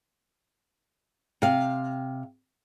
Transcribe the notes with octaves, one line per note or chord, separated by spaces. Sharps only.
C3 F5